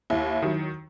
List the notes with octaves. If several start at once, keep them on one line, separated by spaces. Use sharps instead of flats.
D#2 E4
D#3 F#3